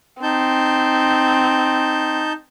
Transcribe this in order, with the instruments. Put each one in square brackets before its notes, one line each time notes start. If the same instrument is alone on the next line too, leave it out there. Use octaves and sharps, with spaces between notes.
[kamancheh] C4 [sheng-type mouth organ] D#4 A5 G6